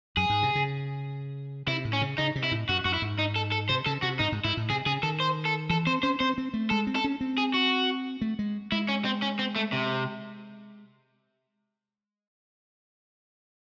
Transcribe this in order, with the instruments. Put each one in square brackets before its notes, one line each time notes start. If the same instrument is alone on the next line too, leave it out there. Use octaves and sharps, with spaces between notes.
[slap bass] F#2 [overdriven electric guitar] G#4
[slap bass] G#2
C3
C#3
[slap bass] C3 [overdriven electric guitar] E4
[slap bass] A2
[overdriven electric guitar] C#4
[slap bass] C#3
[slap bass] C#3 [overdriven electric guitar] D#4
[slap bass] C3
[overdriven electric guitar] E4
[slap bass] A2
[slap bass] F#2 [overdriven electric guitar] F#4
[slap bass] F#2 [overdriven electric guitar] F#4
[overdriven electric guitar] E4
[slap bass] G#2
[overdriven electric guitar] D#4
A4
A4
[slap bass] C3 [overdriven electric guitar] C5
[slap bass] C#3 [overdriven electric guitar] A4
[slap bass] C3 [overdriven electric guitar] F#4
[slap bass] G#2 [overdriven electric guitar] D#4
[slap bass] G#2
[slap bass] G#2 [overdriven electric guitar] E4
[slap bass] A2
[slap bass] C3 [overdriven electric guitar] G#4
[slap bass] C#3 [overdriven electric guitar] G#4
[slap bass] D#3 [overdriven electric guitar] A4
[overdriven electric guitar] C5
A4
[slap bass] E3 [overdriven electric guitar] A4
[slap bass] C4 [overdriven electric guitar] C5
[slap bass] C#4 [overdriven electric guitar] C5
[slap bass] C4 [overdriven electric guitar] C5
[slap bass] C4
A3
[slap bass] G#3 [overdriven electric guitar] A4
[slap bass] C4
[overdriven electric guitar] A4
[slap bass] C#4
C4
[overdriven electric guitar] G#4
F#4
[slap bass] A3
G#3
[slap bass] G#3 [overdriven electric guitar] E4
[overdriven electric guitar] C#4
C4
C#4
C4
A3
C3